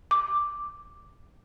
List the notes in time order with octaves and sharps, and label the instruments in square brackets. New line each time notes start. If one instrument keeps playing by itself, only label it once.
[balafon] D6